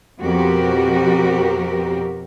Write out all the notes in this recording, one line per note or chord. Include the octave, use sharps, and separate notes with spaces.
F2 B2 C4 F#4 G4 A#4